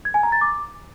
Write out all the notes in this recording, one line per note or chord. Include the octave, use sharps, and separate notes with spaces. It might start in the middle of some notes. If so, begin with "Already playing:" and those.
G#6
G#5
A#5
A6
D6